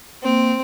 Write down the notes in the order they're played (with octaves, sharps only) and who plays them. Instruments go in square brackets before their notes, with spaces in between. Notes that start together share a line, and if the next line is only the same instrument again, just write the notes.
[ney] A#3 [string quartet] C4